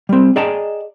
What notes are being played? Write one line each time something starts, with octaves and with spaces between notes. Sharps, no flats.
G3 C4
G#4 D5 D#5 G5 A5 A#5